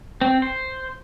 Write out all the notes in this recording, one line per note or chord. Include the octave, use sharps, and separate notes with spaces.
C4
C5